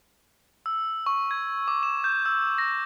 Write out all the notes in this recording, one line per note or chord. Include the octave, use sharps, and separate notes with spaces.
E6
C#6
G#6
D6
E7
G6
E6
A#6